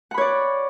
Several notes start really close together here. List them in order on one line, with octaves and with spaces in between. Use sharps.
F#5 B5 C#5 D5